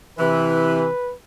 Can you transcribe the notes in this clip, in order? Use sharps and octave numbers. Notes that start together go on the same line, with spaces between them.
C3 E3 B4